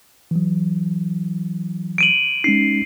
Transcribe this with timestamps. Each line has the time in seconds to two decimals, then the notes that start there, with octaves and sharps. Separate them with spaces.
0.31 E3 F#3
1.98 D7 D#7 F#7
2.44 G#3 C#4 D#4 C7